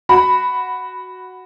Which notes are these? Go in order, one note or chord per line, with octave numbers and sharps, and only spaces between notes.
F#4 B5